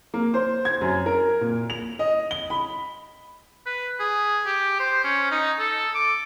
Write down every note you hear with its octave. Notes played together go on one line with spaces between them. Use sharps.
A#3
C5
G#6
F#2
A#4
A#2
F7
D#5
G7
B5
B4
G#4
G4
C5
C#4
D#4
A4
D6